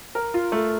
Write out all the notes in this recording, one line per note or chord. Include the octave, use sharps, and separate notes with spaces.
A#4
F4
A3